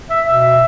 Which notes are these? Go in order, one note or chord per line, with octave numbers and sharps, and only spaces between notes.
E5
B2 E5